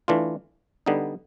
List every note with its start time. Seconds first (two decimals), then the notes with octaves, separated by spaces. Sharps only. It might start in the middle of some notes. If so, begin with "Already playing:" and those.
0.08 E3 A3 D4 F4
0.86 D3 G3 B3 D#4